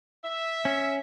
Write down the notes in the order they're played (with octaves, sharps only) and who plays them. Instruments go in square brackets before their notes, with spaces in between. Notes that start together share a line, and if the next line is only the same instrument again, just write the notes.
[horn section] E5
[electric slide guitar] C#4